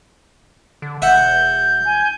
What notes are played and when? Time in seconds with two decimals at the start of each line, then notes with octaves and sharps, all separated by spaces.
0.82 D3
1.02 E1 E5 F#5 G6
1.85 G#5